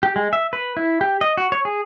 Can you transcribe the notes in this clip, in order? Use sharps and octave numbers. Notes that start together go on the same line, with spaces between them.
G4
G#3
E5
B4
E4
G4
D#5
F#4
C#5
G#4